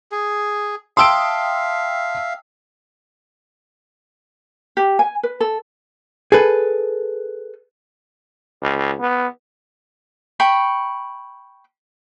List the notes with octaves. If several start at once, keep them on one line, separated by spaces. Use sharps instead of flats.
G#4
E5 F5 G5 A5 C6 D#6 E6 D7
G4
G#5
B4
A4
G#4 A4 B4
C#2
B3
G5 B5 C#6